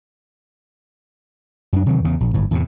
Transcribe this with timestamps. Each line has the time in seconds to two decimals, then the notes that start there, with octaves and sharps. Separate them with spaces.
1.73 F#2 D4
1.86 C3 D#3 E3 F#3
2.05 E2 C#3
2.20 A#1
2.34 G1 A2
2.51 E2 A2 C3